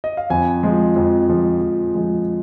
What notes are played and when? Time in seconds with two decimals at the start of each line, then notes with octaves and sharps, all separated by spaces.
0.04 D#5
0.17 F5
0.30 F2 G#5
0.63 F3 G#3
0.96 F2
1.29 F3 G#3
1.61 F2
1.94 F3 G#3